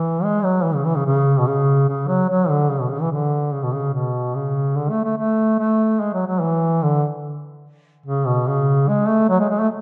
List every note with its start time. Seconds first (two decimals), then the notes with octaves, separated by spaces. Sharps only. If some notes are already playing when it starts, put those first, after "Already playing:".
Already playing: E3
0.23 G#3
0.44 F#3
0.64 E3
0.75 C#3
0.85 E3
0.96 C#3
1.06 C#3
1.39 B2
1.47 C#3
1.88 C#3
2.08 F#3
2.30 F#3
2.50 D3
2.71 C#3
2.81 B2
2.91 C#3
3.01 E3
3.12 D3
3.53 C#3
3.63 B2
3.73 C#3
3.94 B2
4.35 C#3
4.76 D3
4.90 A3
5.04 A3
5.18 A3
5.59 A3
6.00 G#3
6.14 F#3
6.27 F#3
6.41 E3
6.82 D3
8.06 C#3
8.27 B2
8.47 C#3
8.88 G#3
9.09 A3
9.29 F#3
9.40 G#3
9.50 G#3
9.60 A3